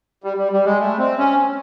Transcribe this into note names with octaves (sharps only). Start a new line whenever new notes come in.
G3
G3
G3
G#3
A3
C4
C#4